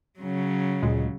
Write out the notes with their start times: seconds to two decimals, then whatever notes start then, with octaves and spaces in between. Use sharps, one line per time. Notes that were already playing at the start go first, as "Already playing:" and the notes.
0.20 C#3 F#3
0.83 D2 A#2 G#3